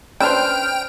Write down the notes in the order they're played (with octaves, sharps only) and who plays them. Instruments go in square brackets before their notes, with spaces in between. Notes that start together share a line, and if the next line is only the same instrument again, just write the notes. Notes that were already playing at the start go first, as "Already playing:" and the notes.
[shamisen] C#4 D4 [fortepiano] B4 C5 [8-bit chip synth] G5 [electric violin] F6